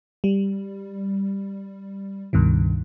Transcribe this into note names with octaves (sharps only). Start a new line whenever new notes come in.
G3
C#2 G2 B2 D#3